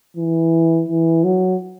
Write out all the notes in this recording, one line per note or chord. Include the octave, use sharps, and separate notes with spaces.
E3
E3
F#3